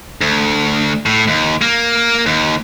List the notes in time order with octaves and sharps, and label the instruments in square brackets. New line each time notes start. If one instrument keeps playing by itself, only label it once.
[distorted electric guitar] D2
A2
D#2
A#3
D#2